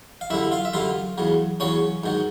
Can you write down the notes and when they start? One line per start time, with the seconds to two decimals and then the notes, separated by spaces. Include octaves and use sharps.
0.21 F5
0.30 F#2 D3 G3 E4 E5
0.51 F4 F5
0.65 E5
0.73 F#2 D3 G3 F4 F5
1.18 E2 C#3 F#3
1.60 E2 C#3 F#3 C#4 C#5
2.04 G#2 D#3 F#3